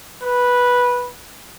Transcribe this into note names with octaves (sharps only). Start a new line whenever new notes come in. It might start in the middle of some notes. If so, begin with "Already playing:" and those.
B4